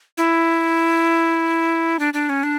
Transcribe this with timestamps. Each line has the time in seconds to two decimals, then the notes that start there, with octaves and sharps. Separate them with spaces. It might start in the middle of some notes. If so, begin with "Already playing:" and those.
0.18 E4
1.99 D4
2.14 D4
2.29 C#4
2.43 D4